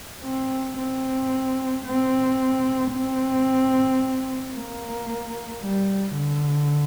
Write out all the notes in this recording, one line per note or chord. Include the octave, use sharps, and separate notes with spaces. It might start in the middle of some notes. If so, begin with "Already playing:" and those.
C4
C4
C4
C4
A#3
G3
D3